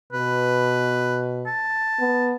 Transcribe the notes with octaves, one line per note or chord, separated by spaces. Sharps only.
B2 B4
A5
B3